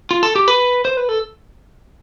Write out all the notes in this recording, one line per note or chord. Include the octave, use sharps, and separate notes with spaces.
F4
A4
G4
B4
C5
B4
A4